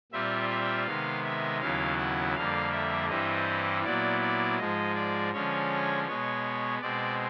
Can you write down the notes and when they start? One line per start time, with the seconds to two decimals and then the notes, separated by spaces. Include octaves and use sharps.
0.12 A#2 G3 C4 F4 E5
0.50 E5
0.87 C3 D#3 G#3 B3 F5
1.24 E5
1.61 D#2 C#3 F#3 B3 E4 F5
1.98 F#5
2.35 F2 D3 G3 A#3 F5
2.72 E5
3.09 G2 E3 G3 C4 E4 D#5
3.84 A#2 F#3 B3 E4 D5
4.21 D5
4.58 G#2 F3 G#3 D#5
4.96 D5
5.33 D3 F3 G#3 C#4 C#5
6.07 B2 G#3 B3 C#5
6.82 B2 G#3 C4 D5